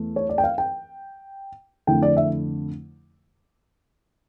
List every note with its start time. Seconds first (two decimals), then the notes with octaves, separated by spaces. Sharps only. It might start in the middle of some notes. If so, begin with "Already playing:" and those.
Already playing: E2 E3 A3
0.16 C#5
0.29 D5
0.38 G5
0.44 F5
0.58 G5
1.87 F2 D3 A3 E4 G5
2.03 D5
2.17 E5